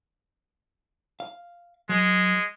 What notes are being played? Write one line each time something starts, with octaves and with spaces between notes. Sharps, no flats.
F5
F#3 G#3